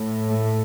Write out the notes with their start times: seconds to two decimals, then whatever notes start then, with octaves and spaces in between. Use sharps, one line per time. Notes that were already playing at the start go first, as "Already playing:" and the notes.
Already playing: A2
0.30 A3